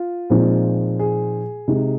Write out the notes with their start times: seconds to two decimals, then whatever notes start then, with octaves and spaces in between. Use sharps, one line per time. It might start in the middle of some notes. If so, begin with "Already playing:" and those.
Already playing: F4
0.30 A#2 F3 G#3 C4 D#4
0.99 G#4
1.68 C3 G#3 D#4